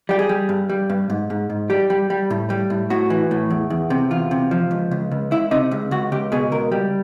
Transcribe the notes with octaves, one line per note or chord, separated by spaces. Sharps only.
G3 G4
G#4
G3
G2
G3
G2
G#2
G#2
G#2
G3 G4
G3
G3
A2
G3
A2
A2 F#4
E3
A2
E2
E2
C3
E2 F4
C3
F3
C#2
C#2
C#2
C#2 E4
C3 D#4
C#2
C#2 F#4
C#2 G4
B2 G#4
C#2 A#4
G3